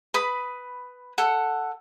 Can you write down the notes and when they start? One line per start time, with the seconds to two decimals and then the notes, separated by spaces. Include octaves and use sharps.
0.14 B4 B5 D#6
1.18 A4 F#5